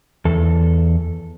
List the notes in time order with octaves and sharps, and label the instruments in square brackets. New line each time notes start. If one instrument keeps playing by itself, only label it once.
[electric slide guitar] E2 A4